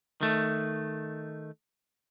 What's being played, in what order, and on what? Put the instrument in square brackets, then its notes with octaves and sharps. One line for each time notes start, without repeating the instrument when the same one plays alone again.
[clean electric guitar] D#3 A3